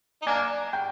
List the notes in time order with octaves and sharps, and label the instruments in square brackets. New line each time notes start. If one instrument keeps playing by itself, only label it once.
[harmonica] D#4
[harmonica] A#3 D4 [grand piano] G#5 G#6
[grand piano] G5 G6